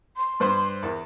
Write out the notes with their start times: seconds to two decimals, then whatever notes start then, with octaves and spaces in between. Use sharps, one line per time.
0.17 C6
0.40 G2 B4 C5
0.83 E2 A#4